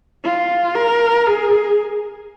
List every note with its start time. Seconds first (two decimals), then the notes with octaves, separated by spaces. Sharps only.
0.24 F4
0.75 A#4
1.27 G#4